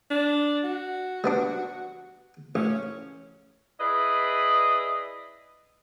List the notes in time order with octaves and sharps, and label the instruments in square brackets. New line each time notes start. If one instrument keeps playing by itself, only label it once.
[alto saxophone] D4
F#4
[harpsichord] G3 B3 D4
[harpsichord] A1 [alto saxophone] C#4
[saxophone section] E4 G#4 B4 D5 D#5